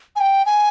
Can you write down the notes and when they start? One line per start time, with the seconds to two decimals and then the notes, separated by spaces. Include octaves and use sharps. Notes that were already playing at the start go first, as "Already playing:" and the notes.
0.16 G#5
0.20 G5
0.46 G#5